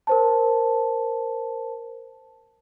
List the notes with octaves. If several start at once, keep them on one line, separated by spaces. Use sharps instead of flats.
A#4 C5 A5